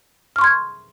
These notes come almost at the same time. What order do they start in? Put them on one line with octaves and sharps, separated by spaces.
F6 C#6 C6 G#6